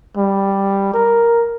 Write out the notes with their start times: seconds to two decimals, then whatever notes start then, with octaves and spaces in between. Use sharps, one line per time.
0.17 G3
0.94 A#4